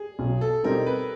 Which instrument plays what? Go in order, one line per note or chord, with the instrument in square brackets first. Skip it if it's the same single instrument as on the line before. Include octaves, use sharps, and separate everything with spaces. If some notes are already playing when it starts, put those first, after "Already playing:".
Already playing: [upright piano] G#4
[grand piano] B1
[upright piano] A4
[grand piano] B2 G3 C4 D#4 [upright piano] A#4
[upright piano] B4